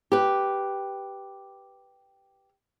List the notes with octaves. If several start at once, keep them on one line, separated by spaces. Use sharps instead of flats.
G4 B4